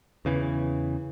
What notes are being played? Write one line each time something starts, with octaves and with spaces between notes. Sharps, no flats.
E2 C#3 E3